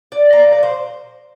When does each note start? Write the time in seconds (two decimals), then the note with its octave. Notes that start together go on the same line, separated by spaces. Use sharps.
0.12 D5
0.33 A#5
0.44 A#2 F3
0.52 D5
0.63 C5